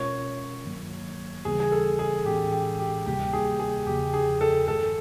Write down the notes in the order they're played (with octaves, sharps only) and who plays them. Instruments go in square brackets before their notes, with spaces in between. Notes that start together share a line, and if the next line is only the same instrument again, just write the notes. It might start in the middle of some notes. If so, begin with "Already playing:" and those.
Already playing: [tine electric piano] B2 G#3 C#4 F4 A#4 [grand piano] C#5
[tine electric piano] G2 D#3 F#3 A#3
[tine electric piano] D#2 C#3 E3 G3 B3 [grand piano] G#4
[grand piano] G#4
A4
G#4
[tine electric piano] A2 E3 G#3 C#4 [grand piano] G4
[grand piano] G4
G4
[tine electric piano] D2 C3 D#3 G3 A#3 [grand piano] G4
[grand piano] G#4
G#4
[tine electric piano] E2 C#3 F3 [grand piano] G4
[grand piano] G#4
A4
[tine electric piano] G2 D#3 G#3 [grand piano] A4